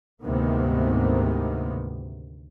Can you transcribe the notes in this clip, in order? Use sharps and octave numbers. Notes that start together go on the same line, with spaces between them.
D2 G#2 C3 D#3 A#3 B3